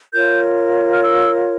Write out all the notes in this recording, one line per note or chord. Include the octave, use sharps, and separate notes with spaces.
F4 A#4 C#5 G6
F6
E6